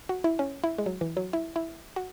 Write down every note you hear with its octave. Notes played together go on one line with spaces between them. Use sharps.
F#4
E4
C#4
E4
G#3
F#3
E3
F#3
E4
E4
F#4